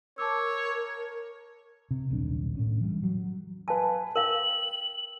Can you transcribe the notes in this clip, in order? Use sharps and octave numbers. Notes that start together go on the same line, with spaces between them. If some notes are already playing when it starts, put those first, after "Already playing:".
A#4 C#5 A5 D6 E6
C3
D#1 B1 D4
A2 C#4
E3 G3
F#3
B4 F5 G#5 A5
A#4 F5 G5 F#7